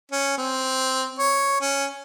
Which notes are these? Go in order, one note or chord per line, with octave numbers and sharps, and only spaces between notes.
C#4
C4
C#5
C#4